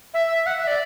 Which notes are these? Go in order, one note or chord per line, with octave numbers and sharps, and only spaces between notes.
E5
F#5
E5
D5